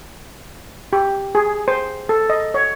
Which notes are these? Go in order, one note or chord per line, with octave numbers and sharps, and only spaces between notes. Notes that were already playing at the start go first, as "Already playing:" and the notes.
G4
G#4
C5
A4
D#5
C#5